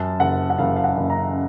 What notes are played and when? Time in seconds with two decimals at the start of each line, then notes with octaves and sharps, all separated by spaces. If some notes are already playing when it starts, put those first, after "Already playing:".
Already playing: F#2 A5
0.20 F#1 F#5
0.50 F#5
0.58 F#1 F5
0.76 F5
0.84 F#5
0.97 F#1
1.10 A#5